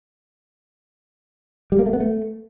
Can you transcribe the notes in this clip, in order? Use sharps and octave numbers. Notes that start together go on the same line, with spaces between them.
G3
A#3
A3
B3
A3